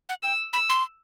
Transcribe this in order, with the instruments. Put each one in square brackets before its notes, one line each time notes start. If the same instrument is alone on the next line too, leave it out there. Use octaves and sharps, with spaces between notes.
[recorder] F#5
[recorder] G5 [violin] E6
[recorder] B5 [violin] E6
[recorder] C6